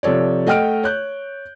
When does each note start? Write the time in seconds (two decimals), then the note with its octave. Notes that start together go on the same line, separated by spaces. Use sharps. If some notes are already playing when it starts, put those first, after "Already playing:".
0.03 C3 F3 A4 C#5 D5
0.46 A3 D#5 F#5 G5 F6 D7
0.84 C#5 F#6 G6